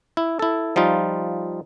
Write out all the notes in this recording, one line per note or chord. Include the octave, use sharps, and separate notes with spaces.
E4
E4 A4
F3 G3 D#4 F4